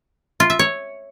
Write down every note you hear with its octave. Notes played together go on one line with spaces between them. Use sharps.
F4
E5
C#5